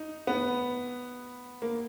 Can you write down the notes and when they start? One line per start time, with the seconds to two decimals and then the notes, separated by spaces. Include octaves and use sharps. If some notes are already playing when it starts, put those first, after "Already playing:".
Already playing: D#4
0.27 B3
1.62 A#3